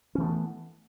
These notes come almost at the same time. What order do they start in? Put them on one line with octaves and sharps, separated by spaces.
C#4 E3 A3 B3